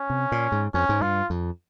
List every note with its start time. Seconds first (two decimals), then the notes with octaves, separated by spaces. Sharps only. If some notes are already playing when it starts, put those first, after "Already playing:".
Already playing: C#4
0.10 C3
0.32 A#2
0.52 G#2
0.74 F2 C#4
0.89 G#2
1.01 G2 F4
1.30 F2